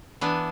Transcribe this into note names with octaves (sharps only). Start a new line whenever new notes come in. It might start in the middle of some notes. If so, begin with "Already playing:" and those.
E3 B3 D4